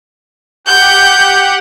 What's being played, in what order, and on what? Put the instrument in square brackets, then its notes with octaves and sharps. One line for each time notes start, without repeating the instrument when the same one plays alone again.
[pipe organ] G4 F#5 [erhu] G6